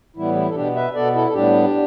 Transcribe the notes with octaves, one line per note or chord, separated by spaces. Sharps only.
A2 E3 G3 B3 E4
E4
A4
B2 B3 D4 G4
B4 E5
B2 B3 A4 D5
E4 A4
A4
A2 G3 B3 D4 G4